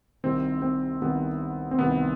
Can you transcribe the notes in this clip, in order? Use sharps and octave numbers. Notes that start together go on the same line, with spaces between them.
C2 C3 D#3 C4
C4
C2 C3 D#3 B3
C4
C2 C3 D#3 B3